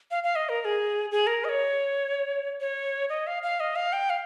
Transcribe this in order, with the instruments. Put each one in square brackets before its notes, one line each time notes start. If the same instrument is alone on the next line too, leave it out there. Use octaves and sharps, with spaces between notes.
[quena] F5
F5
D#5
A#4
A#4
G#4
G#4
A#4
D#5
C#5
C#5
D#5
F5
F5
D#5
F5
G5
F5